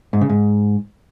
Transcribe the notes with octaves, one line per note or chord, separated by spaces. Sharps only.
G#2
C#3
G#2